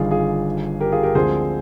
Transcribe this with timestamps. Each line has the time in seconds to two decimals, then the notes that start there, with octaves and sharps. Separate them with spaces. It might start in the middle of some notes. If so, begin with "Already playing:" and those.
Already playing: G1 G2 D#3 F4 G#4
0.11 F4 G#4
0.81 G4 A#4
0.92 F4 G#4
1.03 G4 A#4
1.15 D2 D3 F3 G#3 C4 G#4 C5